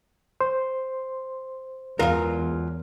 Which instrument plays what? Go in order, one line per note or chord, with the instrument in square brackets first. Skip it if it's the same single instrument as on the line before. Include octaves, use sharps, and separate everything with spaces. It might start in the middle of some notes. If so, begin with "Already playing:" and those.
[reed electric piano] C5 C6
[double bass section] E2 [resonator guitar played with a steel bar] F#3 G#3 F4 [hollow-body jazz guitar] A#4 F5